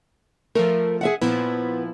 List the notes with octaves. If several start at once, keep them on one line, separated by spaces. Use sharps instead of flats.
F3 A3 A#4
G#4 E5 F#5
A#2 F3 B3 E4